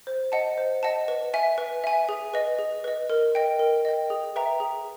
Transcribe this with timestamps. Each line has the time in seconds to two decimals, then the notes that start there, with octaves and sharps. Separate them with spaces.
0.07 C5
0.32 D#5 F#5 A5
0.58 C5
0.83 D#5 F#5 A5
1.08 B4
1.34 E5 G#5
1.58 B4
1.84 E5 G#5
2.09 G#4
2.34 B4 D#5
2.58 G#4
2.84 B4 D#5
3.10 A#4
3.35 D#5 G5
3.59 A#4
3.85 D#5 G5
4.10 G#4
4.36 B4 E5 G5 A#5
4.60 G#4